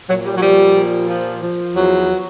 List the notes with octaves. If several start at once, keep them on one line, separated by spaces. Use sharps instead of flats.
A#2 F#3
G3
F#3
F3 G3
A#2
F3
F3
E2 F#3